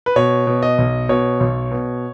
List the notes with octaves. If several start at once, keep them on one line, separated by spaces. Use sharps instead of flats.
B4
B2 C#5
B2
D#5
B1
B2 C#5
B1
B2